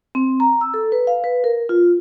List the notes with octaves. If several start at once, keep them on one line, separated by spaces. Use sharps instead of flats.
C4
A#5
E6
A4
B4
F5
B4
A#4
F4